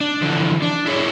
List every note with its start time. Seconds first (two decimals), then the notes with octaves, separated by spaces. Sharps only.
0.01 D4
0.22 D3 E3 F3
0.62 D4
0.86 E4 G#4 C#5